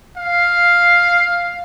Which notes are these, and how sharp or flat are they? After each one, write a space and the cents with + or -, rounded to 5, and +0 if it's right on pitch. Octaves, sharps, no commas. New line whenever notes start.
F5 +5